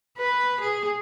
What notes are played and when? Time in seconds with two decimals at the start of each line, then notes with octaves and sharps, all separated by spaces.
0.18 B4
0.61 G#4